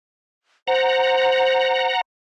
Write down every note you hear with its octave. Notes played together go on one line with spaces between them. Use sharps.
C5 F#5 A#5